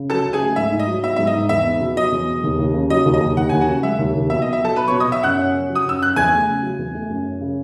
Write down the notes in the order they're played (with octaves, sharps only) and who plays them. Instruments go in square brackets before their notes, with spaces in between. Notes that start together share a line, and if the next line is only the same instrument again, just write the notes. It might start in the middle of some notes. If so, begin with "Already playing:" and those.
Already playing: [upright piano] C#3
[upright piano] F#3 [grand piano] A4 A5
[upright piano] C#2
[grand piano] G#4 G#5
[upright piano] A3
[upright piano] G#2 [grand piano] E5
[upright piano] D#4
[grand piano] D#5
[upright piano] F#3
[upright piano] B3 [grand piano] E5
[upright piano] G#2 [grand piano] E5
[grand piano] D#5
[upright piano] D#4
[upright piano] E2 [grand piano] E5
[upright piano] B3
B2
[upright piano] F#3 [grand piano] D#5
[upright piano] E2
B3
D#2
D#2
C#3
[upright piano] F#3 [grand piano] D#5
[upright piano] D#2
[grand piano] D#5
[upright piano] D#2
[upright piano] D#2 [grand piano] F#5
[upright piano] D#2 [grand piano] G#5
[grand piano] F#4 F#5
[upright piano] C#3
[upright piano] G#3 [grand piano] E5
[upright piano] D#2
D#2
[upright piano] B2 [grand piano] E5
[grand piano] D#5
[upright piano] B2
[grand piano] E5
[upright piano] F#3 [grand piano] A4 A5
[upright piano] B3 [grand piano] B4 B5
[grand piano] C#5 C#6
[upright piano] B2
[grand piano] D#5 D#6
[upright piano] B2 [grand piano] E5 E6
[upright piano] F#2 [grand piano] F#5 F#6
[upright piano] C#4
C#3
F#3
[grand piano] D#6
[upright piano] F#2 [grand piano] E6
[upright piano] C#4 [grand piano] F#6
[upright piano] E2 [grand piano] G#5 G#6
[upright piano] A3
C#3
F#3
E2
A3
F#2
C#4
C#3